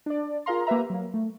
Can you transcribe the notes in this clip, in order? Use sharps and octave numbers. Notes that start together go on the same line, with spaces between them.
D4 D5
F4 G#4 A#4 F5 A#5 C6
A#3 G4 B4 E5 A#5
F#3 A#3
A3